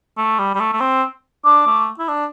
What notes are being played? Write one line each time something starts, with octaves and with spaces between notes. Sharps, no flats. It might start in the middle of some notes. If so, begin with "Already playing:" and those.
A3
G3
G3
A3
A3
C4
D4 D6
A3
E4
D4